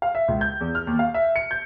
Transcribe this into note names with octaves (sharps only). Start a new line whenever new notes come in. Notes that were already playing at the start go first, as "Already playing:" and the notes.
F5
E5
C#2
G6
E2
F6
D#2
F5
E5
C#7
G6